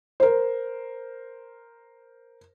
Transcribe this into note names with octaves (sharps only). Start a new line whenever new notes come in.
A#4 C5